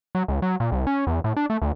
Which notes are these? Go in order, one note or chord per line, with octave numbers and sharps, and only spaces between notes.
F#3
C#2
F#3
A#2
C2
C#4
E2
A2
D4
A3
D2